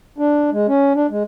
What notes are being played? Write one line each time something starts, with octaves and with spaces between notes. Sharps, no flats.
D4
G#3
C#4
D4
G#3